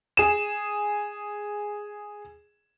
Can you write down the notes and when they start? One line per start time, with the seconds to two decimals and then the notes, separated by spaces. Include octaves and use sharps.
0.17 G#4 E7